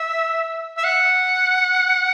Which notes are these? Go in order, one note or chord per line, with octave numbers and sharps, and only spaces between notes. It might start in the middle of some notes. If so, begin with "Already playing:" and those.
Already playing: E5
E5
F#5